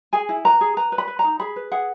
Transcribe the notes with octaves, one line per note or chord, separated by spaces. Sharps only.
G#4 G#5
E4
B4 A#5
G#4
B4 A#5
B4
B5
B4
A#5
D#4
G#4 B5
B4
G#4 F#5